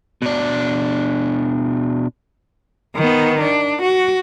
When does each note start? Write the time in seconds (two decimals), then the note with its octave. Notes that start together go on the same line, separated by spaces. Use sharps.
0.22 B2 D4
2.96 D#3 B3
3.41 D4
3.82 F#4